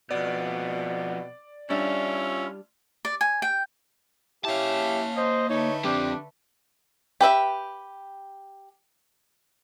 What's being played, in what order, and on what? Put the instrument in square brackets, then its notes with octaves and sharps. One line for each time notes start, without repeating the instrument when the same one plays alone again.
[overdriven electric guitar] F2 B3 [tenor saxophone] B2 [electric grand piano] D5
[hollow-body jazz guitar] G3 D4 [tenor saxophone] C#4 [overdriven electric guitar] E4 F4
[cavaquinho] D5
G#5
G5
[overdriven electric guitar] A#3 A5 [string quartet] C#4 F5 [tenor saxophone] E4 [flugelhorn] G4
[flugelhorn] C5 [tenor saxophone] D#5
[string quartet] D3 A3 B4 [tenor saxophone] D#4 [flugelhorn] C#5
[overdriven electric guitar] F3 C4 [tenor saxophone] D4 [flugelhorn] G4
[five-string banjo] G4 B4 E5 G5